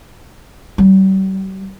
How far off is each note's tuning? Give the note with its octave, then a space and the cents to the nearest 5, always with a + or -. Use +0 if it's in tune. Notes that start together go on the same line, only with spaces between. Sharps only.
G3 -40